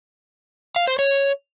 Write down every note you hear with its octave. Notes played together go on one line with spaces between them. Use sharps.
F5
C5
C#5